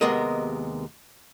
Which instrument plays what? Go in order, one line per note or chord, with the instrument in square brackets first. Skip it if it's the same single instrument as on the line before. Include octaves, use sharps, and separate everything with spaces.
[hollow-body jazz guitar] D#2 C3 G#3 B3 A#4 D#5